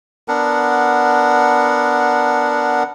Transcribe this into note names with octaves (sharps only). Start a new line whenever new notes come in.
B3 D4 A#4 F#5